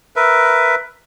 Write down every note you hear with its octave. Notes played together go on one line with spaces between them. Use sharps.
A#4 B4 E5